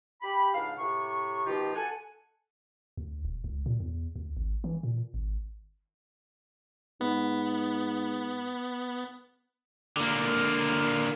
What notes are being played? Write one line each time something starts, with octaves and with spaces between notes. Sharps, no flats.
G4 B5
C#2 G#2 D4 F5
A2 C3 C#6
B2 D#3 F3 D#4 F4 G4
A4 F#5 G#5
D2
D#1
C#2
A#2
E2
D2
G#1
E3
A#2
G#1
G#2 B3
D3 A#3